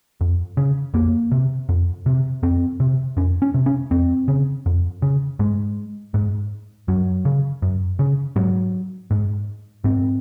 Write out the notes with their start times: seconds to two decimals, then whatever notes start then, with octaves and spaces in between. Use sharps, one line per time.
0.21 F2
0.57 C#3
0.94 F2 A#3
1.32 C3
1.69 F2
2.06 C3
2.43 F2 C4
2.80 C3
3.17 F2 C#4
3.42 C#4
3.54 C3
3.66 C#4
3.91 F2 C4
4.28 C#3
4.66 F2
5.02 C#3
5.39 G#2 G#3
6.14 G#2
6.88 F#2 F#3
7.25 C#3
7.62 F#2
7.99 C#3
8.36 G#2 F#3
9.11 G#2
9.84 G#2 C4